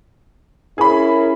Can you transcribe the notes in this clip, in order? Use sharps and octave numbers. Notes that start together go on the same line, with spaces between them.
C#4 E4 G#4 A#4 B5